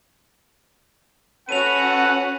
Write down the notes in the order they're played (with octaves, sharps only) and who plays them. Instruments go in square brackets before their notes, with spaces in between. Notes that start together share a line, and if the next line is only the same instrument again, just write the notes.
[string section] C#4 F#4 [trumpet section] A4 B4 [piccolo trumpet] F#5 [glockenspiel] D#7 F7